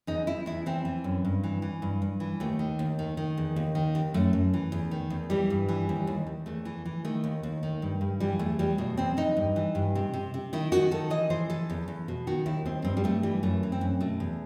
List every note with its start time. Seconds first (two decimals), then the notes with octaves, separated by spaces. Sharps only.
0.07 E2 D#4
0.27 E2 E4
0.46 E2 E4
0.66 E3 C4
0.85 E3
1.04 F#2
1.25 G2
1.44 E3
1.62 E3
1.82 G2
2.02 G2
2.20 E3
2.40 D#2 A3
2.59 D#3
2.79 D#2
2.99 D#3
3.17 D#3
3.37 E2
3.56 D#2
3.75 D#3
3.95 D#2
4.14 F#2 A3
4.33 F#2
4.54 E3
4.72 E2
4.91 D#3
5.10 E2
5.30 E3 G3
5.50 G2
5.69 E3
5.89 D#2
6.07 D#2
6.27 D#2
6.46 E2 A3
6.65 E3
6.85 E3
7.05 D#3 A3
7.24 D#2
7.43 D#2
7.63 D#3
7.82 G2
8.01 G2
8.20 E3 G3
8.39 E2 A3
8.59 E2 G3
8.78 B2 A3
8.97 E2 C4
9.17 E2 D#4
9.37 G2
9.56 E3
9.75 G2
9.95 C3
10.14 C3
10.34 C3
10.53 D#3 E4
10.72 D#3 F#4
10.91 D#3 A4
11.10 E3 D#5
11.30 E3 C5
11.50 E3 A4
11.70 E2
11.88 E2
12.08 B2
12.27 D#3 F#4
12.46 D#2 E4
12.66 D#2 C4
12.85 G2 C4
12.97 G3
13.04 G2 A3
13.23 E3 G3
13.43 F#2 A3
13.63 E3
13.72 C4
13.81 F#2
14.00 B2 A3
14.20 E2